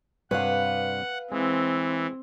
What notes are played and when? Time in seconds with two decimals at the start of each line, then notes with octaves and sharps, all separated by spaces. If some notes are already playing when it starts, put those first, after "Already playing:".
0.31 G2 C3 B4 C#5 F5 F#5
1.32 E3 G#3 C4